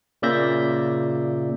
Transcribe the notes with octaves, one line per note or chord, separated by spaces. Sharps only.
A#2 C#3 D5 E5 G6 A#6